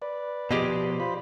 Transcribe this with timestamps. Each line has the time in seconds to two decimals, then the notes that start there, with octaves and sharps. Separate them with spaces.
0.02 B4 D5
0.51 B2 F3 G4 G#4 D#5
1.00 F4 C5 B5